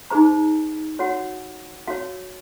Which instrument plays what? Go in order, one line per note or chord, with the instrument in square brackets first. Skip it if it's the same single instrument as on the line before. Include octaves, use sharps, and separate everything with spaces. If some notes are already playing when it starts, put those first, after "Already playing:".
[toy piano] D#4 G#4 C5 A#5
F#4 C#5 F#5
F#4 C#5 F5